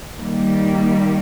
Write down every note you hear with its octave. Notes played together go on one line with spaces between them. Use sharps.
D#3 G3 A#3